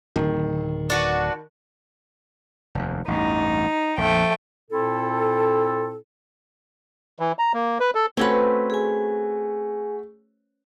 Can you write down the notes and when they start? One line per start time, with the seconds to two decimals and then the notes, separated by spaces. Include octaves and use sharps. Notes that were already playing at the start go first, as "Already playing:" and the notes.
0.16 D1 D#3
0.90 D4 F#4 B4
2.75 F1 D#2
3.08 A1 E2 G2 D#4
3.98 A#1 F2 F3 A3 G5
4.71 A#2 C4 E4 A4
7.19 E3
7.39 A#5
7.53 A#3
7.80 B4
7.95 A4
8.17 A3 C4 C#4 F#4 B4
8.70 G#4 G#5